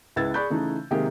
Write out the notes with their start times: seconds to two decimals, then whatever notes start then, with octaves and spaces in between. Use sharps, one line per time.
0.16 C#2 E4 B4 E6 G#6 A6
0.34 G#4 D5 B5 C#6 F#6 G6
0.50 C#3 E3 A3 D#4
0.91 C3 D#3 G#3 A#3 G4 G#4